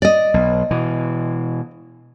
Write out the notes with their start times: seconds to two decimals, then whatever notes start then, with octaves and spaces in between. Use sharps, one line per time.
0.02 D5 D#5
0.34 B1
0.71 B2 E3